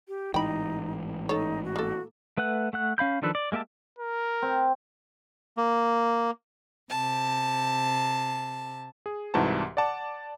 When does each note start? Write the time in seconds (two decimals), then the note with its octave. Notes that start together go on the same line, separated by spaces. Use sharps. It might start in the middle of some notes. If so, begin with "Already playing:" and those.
0.08 G4
0.34 A1 G#2 E3 D#4 G5 B5
1.29 D#4 A4 C#5
1.64 F#4
1.76 A#3 A4
2.38 A3 B4 F#5 F#6
2.73 A3 F#5 F#6
2.98 C#4 F5 B5 G6
3.22 D#3 F3 D4 A4 B4
3.35 D5
3.52 G#3 A#3 G4 E5 A5
3.99 A#4
4.42 C4
5.57 A#3
6.89 C3 A5
9.06 G#4
9.34 C2 G#2 E3 F#4 A5 A#5
9.77 D5 F#5 A5 D6